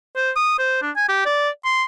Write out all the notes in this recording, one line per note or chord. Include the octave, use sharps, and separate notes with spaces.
C5
D#6
C5
D4
G#5
G4
D5
C6